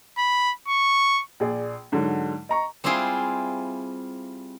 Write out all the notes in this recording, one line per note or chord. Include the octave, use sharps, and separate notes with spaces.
B5
C#6
A#1 G#4 D5
G#2 D3 F#3
D#5 A#5 C#6
G3 C4 E4 F4 G#4 C5